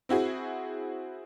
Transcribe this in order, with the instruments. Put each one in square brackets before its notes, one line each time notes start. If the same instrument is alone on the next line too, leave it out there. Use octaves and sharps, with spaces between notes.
[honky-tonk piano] C4 E4 F#4 G#4